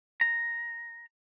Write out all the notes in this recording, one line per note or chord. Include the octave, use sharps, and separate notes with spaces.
A#5